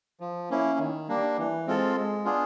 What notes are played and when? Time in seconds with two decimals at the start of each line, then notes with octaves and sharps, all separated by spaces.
0.20 F3
0.50 A#3 C#4 E4
0.79 D#3
1.09 G3 A#3 D4
1.38 E3
1.67 G#3 C4 F4 A4
1.96 G#3
2.25 B3 D4 F4 G#4